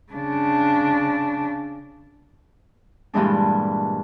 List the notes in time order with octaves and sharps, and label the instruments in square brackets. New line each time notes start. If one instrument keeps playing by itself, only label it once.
[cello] C#3 D4
[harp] G2 A#2 E3 G#3 D4